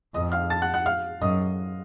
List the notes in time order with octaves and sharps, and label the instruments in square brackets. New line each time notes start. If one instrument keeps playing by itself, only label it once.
[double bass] F2 [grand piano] D#5 D#6
[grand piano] F5 F6
A5 A6
F#5 F#6
F#5 F#6
F5 F6
[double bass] F#2 [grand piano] D#5 D#6